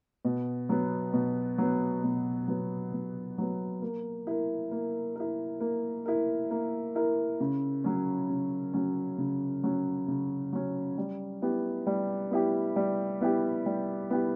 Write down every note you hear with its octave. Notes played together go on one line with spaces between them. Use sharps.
B2
F#3 B3
B2
F#3 B3
B2
F#3 B3
B2
F#3 B3
A#3
E4 A#4
A#3
E4 A#4
A#3
E4 A#4
A#3
E4 A#4
C#3
F#3 C#4
C#3
F#3 C#4
C#3
F#3 C#4
C#3
F#3 C#4
G3
B3 E4 G4
G3
B3 E4 G4
G3
B3 E4 G4
G3
B3 E4 G4